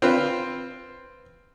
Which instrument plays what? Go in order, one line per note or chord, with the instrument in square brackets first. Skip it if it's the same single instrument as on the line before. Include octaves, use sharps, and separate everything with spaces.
[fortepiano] C4 F4 B4